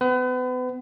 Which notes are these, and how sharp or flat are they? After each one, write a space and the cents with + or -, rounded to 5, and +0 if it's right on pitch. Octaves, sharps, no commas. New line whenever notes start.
B3 +35 B4 +35